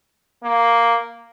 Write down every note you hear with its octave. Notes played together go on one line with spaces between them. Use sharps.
A#3